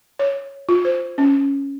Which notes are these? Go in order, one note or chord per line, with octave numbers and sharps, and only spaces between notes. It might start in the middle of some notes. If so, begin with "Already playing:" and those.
C#5
F4
C5
C#4